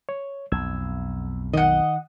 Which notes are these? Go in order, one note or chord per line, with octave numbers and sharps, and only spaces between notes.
C#5
B1 F2 E6 G#6
D#3 D#5 F#5